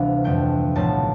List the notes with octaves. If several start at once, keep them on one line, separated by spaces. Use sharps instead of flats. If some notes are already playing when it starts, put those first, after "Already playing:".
Already playing: D2 C3 E3 G3 B3 D4 F5
F2 D3 A3 G5
B1 A2 F3 A5